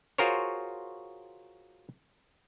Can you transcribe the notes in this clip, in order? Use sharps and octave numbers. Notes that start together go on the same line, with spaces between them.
F4 F#4 G#4 A#4 C5 C#5